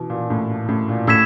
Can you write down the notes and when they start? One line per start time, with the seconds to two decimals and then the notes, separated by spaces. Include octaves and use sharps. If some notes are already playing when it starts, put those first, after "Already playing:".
Already playing: B2 E3
0.10 A#2
0.30 A2
0.69 A2
0.89 A#2
1.07 A2 E6 G#6 B6 E7